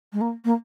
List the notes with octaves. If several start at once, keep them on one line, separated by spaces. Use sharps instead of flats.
G#3
A#3
A#3